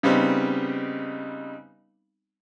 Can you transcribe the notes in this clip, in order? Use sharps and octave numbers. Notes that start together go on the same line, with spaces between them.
C#3 G3 B3 C4 D#4